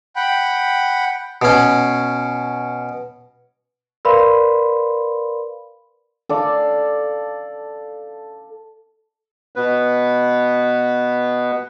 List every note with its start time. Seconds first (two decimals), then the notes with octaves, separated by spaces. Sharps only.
0.16 F#5 G5 B5
1.42 B2 C#4
4.05 A#4 B4 D5 F5 B5 C6
6.29 A4 D5 F5
9.55 B2 B3 B4